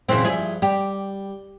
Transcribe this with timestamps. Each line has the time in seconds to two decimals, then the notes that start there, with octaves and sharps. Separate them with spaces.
0.09 F#2 A#2 C#3 E3 C4
0.24 G2 F3 E4 G#4
0.62 G3 G4